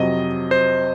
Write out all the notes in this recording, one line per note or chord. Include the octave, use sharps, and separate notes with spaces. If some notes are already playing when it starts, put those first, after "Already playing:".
Already playing: F2 C3 F#3 D#5
C5